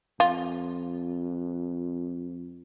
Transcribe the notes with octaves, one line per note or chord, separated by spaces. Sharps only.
F2 F4